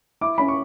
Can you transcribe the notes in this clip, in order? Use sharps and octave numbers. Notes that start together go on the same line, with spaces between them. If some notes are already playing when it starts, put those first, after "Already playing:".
E4 D6
C#4 B5
C#6